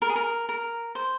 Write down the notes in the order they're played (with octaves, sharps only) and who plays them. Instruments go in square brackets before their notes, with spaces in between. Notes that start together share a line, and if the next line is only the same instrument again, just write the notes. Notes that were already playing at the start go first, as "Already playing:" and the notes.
[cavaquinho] A#4
G#4
A#4
A#4
C5